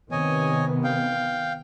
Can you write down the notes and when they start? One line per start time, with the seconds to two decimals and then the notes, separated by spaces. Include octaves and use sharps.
0.11 C3 D#3 B3 C#5 D#5 G#5
0.84 F5 G5